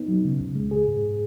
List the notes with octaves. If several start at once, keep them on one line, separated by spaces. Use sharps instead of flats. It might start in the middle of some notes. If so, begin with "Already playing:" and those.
Already playing: B3 D#4
F#3
C#3
C#2
G#3
G#4
G#2